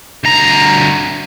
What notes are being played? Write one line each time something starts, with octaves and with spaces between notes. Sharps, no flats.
D2 A#5